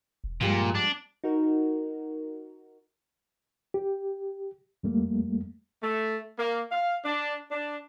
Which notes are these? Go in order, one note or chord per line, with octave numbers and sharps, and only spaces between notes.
E1
G2 A#2 F3 G3 G#3
D4
D#4 F#4 A#4
G4
F2 G3 A3 A#3
A3
A#3
F5
D4
D4